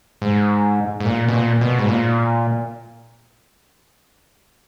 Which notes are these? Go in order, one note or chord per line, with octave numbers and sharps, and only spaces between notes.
G#2
G#2
A#2
B2
A#2
B2
G#2
A#2